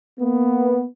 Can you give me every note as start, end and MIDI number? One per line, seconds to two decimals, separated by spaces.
0.20 0.84 58
0.20 0.84 59